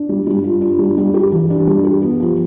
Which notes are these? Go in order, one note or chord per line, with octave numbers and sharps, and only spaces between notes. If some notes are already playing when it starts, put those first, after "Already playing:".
Already playing: D4
G3
G3
F4
D4
G3
G3
G4
E3
D4
G3
G4
B3
F3